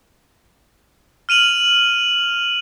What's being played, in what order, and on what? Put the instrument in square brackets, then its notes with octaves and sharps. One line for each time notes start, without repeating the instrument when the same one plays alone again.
[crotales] F6 D#7 F7 F#7